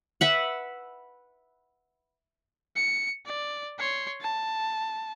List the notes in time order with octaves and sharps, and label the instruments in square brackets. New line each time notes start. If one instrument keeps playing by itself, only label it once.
[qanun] B4 E5 F#5
[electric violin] C#7
D5
C#5 C6
A5